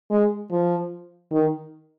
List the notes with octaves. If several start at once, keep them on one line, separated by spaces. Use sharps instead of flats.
G#3
F3
D#3